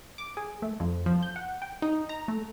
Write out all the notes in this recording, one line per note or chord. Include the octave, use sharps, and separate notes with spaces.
D6
G#4
A3
F2
F3
G6
F#5
G5
D#4
A#5
A3